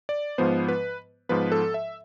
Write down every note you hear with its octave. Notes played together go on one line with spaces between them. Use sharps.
D5
G#2 F3 B3 C5
B4
G#2 F3 B3 B4
A4
E5